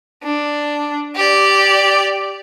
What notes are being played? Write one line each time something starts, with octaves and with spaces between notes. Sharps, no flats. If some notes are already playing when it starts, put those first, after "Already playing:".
D4
G4 D5